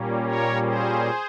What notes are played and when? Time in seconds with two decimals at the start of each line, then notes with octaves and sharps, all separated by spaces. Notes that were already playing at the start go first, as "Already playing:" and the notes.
Already playing: A#2 G3 A#3 C#4
0.22 A#4 C#5
0.63 G#4 C5